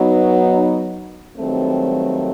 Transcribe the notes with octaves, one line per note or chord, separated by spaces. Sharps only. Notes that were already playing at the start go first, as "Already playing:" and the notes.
Already playing: F#3 B3 D#4
G2 D#3 F#3 A3 C4